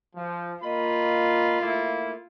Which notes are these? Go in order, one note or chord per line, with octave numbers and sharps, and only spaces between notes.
F3
A#3 F4 D#5 B5
A3 A#3 E4